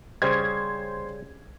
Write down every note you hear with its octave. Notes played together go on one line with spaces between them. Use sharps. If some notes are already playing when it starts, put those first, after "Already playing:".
C#3 G3 C5 G#6